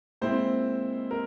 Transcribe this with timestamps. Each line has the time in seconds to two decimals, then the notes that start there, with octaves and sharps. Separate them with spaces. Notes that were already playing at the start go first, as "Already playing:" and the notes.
0.21 A#2 G#3 C4 E4 C5
1.11 A#4